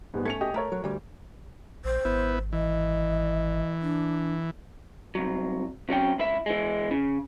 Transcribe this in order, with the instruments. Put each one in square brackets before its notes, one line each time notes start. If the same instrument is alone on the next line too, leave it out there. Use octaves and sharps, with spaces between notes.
[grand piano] G#2 G3 B3
[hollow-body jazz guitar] A3 C#4 [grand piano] G#6 C#7 F7
[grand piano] G4 D#5 D#6
[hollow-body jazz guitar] A3 [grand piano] A4 A#4 C#5
[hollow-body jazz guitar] F#3
D2 G3
[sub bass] A#1 [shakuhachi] C5
[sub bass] G#1 [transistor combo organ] B3 E4
[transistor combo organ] E3 [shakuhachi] D#5
[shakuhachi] D4
[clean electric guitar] C2 F#3
C3 F#3 C#4 G5
C#2 E4 E5
E3 G#3
C#3